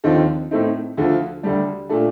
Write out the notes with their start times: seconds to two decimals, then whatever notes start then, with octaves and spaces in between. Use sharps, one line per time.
0.04 D#2 D3 F3 C4 D#4
0.51 A2 A3 C4 D#4
0.97 D2 D3 F3
1.43 D2 D3 G3 D4
1.89 A#2 A3 D4